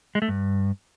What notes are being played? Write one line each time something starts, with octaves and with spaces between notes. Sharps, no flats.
G#3
A3
G2